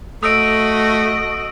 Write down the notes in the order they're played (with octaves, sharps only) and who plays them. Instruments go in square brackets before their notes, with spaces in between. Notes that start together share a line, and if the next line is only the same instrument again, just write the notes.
[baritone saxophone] A3 [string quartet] F#4 D#5 [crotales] D#6 E6 D7